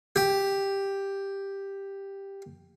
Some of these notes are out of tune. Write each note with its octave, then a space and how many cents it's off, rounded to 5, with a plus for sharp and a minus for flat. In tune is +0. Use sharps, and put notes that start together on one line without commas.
G4 +5